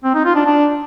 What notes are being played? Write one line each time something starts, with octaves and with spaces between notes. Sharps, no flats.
C4
D#4
F4
D4
D4